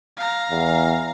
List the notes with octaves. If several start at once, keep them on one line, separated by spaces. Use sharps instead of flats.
F5 A#5
E2